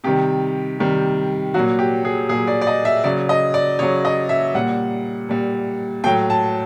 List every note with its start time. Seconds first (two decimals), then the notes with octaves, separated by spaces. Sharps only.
0.04 C3 D#3 G3 G4
0.79 C3 D#3 G3
1.54 A#2 F#3 F#4
1.79 G4
2.05 G#4
2.29 A#2 F#3 G#4
2.47 D5
2.61 D5
2.67 D#5
2.85 E5
3.04 C#3 F#3 D5
3.29 D#5
3.54 D5
3.79 C#3 F#3 C#5
4.05 D#5
4.29 E5
4.54 A#2 G3 F#5
5.29 A#2 G3
6.04 A2 F#3 G5
6.30 A5